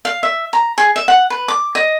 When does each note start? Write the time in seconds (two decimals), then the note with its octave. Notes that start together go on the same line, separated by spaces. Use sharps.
0.05 F5
0.23 E5
0.53 A#5
0.78 G#4
0.96 E5
1.08 F#5
1.30 B4
1.48 D6
1.75 D#5